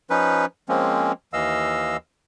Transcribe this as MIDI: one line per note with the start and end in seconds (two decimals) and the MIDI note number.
0.10 0.45 53
0.10 0.45 61
0.10 0.45 63
0.10 0.45 71
0.69 1.12 53
0.69 1.12 56
0.69 1.12 58
0.69 1.12 60
0.69 1.12 61
1.33 1.97 39
1.33 1.97 52
1.33 1.97 75
1.33 1.97 77
1.33 1.97 88